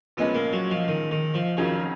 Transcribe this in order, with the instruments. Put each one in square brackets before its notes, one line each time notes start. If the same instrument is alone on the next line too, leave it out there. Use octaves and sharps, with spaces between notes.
[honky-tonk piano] A#2 F3 G#3 C#4 [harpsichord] B3
[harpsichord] A#3
F#3
F3
D#3
D#3
F3
[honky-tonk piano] F2 D#3 F#3 C#4 G#4 [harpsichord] F3